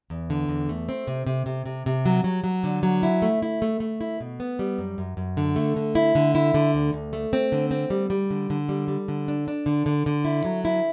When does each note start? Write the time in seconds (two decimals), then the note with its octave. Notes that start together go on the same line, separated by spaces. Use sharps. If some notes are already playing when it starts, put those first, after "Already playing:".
0.10 E2
0.30 D3
0.48 E2
0.69 A3
0.89 C4
1.07 C3
1.26 C3
1.46 C3
1.66 C3
1.86 C3
2.06 F#3
2.24 F#3
2.44 F#3
2.64 D3
2.83 F#3
3.03 E4
3.22 A3
3.42 E4
3.62 A3
3.80 A3
4.01 E4
4.20 B2
4.40 B3
4.59 G3
4.78 F#2
4.98 F#2
5.17 F#2
5.37 D3
5.56 A3
5.76 D3
5.95 E4
6.15 D3
6.35 E4
6.54 D3
6.74 D2
6.93 D2
7.13 A3
7.33 C4
7.52 D3
7.71 C4
7.90 G3
8.10 G3
8.31 D3
8.50 D3
8.69 G3
8.88 G3
9.08 D3
9.28 D4
9.48 D4
9.66 D3
9.86 D3
10.06 D3
10.25 E4
10.45 F#3
10.65 E4